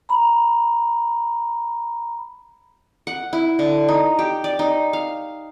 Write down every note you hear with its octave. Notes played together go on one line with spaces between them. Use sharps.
A#5 B5
F#5
E4
D3
D#4
G4
D5
D#4
F5